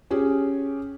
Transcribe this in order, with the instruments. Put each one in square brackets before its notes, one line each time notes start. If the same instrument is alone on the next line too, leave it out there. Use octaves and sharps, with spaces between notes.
[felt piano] C#4 G4 G#4